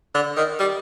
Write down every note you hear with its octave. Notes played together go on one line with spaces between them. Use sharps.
D3
D#3
G3